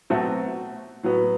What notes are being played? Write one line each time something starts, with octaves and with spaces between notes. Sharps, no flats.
B2 F#3 A3 C4 F#4
A2 F#3 B3